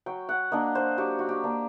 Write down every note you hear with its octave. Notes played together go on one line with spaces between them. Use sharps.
F#3 G5
F#5
A#3 D4 D#5
C5
F#3 G4
F#4
G4
A#3 D4